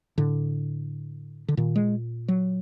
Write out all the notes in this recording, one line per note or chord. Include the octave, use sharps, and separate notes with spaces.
A2 D3
D3
A#2 D#3
G#3
F#3